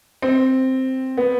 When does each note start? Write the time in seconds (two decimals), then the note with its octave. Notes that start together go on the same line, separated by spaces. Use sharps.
0.22 C4
1.17 B3